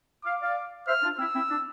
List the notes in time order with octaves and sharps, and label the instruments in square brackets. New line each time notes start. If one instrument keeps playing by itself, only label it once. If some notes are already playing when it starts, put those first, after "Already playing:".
[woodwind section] F5 [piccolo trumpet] D6
[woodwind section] D5 F5
[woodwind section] C5 E5 [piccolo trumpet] F6
[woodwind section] D4 F4
[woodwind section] C4 E4 [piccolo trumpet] E6
[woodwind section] C4 E4
D4